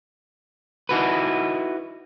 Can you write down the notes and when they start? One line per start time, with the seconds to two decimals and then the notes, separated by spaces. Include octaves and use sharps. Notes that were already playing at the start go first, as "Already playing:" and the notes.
0.89 D#4 E4 F#4 B4